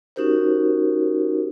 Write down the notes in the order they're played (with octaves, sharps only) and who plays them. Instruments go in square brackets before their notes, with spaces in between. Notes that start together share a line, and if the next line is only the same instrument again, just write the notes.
[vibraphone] C#4 D#4 F#4 G4 A#4 C5